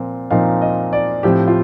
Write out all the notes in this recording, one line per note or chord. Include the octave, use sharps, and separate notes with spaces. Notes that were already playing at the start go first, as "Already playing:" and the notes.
Already playing: A#2 F3 C4
A#2 F3 C4 D#4 F5
D#5
D5
A2 F3 C4 G4
F4